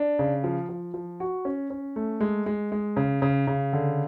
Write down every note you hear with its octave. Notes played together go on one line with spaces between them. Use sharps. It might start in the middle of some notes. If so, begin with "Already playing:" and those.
Already playing: D4
C#3
F3
F3
F3
F#4
C#4
C#4
A3
G#3
G#3
G#3
C#3
C#3
C#3
D3